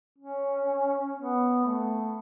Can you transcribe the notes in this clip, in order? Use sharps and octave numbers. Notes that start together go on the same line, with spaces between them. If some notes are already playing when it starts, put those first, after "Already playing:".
C#4
B3
A3